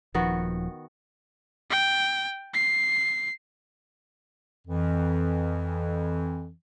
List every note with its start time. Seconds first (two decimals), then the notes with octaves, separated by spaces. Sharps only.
0.14 D#1 D#3 F3 B3 F#4
1.70 G5
2.54 C7
4.67 F2 E3